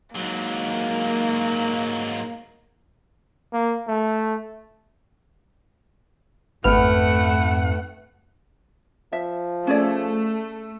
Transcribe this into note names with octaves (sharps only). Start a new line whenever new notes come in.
G#2 F#3 A#3
A#3
A3
G#1 F2 G#2 A3 B3 C4 F#5 F6
F3 E5
A3 C#4 G#4 D5